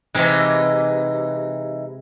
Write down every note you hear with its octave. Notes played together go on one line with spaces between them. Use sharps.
C3 E3 G#3 D#4